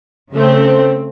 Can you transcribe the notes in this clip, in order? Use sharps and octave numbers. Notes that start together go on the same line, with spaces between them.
C#3 A3 C4